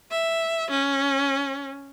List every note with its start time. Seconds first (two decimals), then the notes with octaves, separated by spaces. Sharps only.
0.11 E5
0.71 C#4